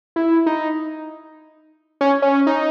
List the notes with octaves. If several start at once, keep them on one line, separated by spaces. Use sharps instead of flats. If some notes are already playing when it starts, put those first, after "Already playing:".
E4
D#4
C#4
C#4
D#4